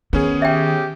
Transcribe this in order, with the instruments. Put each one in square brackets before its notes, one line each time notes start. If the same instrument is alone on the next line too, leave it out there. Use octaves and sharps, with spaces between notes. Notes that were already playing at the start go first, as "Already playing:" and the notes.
[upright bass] D#3 [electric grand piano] B3 C#4 G#4
[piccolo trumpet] G4 [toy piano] E5 G5